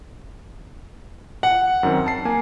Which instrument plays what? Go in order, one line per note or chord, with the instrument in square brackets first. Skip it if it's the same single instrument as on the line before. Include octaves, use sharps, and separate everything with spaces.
[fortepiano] F#5
[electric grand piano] F#2 D#3 C4
A5 C7
A#3 G#5